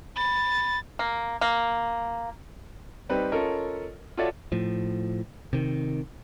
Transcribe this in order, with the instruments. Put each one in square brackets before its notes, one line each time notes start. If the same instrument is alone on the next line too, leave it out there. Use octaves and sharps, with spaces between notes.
[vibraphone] B5 [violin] A6
[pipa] A#3
A#3
[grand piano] G3 C4 D#4 B4
C#4 F4 A4 A#4 C#5 D#5
F4 F#4 A4 C#5 D5 E5
[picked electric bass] A2 F3
C3 D#3